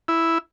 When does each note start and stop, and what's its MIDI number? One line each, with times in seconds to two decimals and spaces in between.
0.08 0.38 64